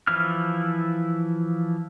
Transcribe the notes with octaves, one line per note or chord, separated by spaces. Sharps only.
E3 F3 E4 F6